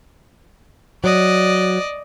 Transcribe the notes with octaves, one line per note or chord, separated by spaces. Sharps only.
F#3 D5 D#5